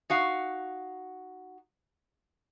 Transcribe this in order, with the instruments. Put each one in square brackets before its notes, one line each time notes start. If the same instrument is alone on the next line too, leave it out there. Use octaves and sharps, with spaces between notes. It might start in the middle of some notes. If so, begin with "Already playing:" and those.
[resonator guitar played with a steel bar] D#4 F#4 F5